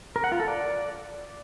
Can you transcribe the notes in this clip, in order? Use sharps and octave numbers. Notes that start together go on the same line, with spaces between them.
A#4
F#5
F4
A4
D5